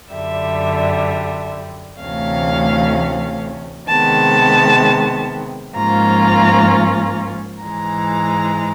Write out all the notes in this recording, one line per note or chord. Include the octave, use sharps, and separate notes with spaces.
F#2 D3 G3 E5
D2 C3 E3 A3 C#4 F5
C3 D#3 G#3 B3 A5
G#2 F3 A#3 C#4 F4 A#5
G#2 E3 G#3 A#5